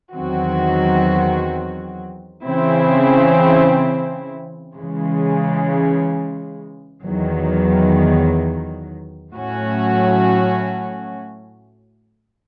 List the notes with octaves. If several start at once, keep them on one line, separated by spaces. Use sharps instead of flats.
E2 D#3 F#3 C4 F#4
C#3 E3 C4 E4
C#3 E3 G#3
E2 D#3 F#3
A2 F#3 A3 C#4 F#4